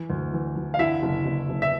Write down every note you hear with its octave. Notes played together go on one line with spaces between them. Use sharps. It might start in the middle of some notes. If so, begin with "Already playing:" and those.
Already playing: E3
D2
E3
E3
F5
D3 E4 E5
F#1
F#1
F#1
E5